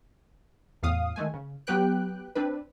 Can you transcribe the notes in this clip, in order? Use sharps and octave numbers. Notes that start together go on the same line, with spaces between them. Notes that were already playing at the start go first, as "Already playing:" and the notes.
E2 A2 F5 D#6
D#3 G#3 A3 G#5
C#3
F#3 B3 G4 B4 G5 F#6
C4 D4 B4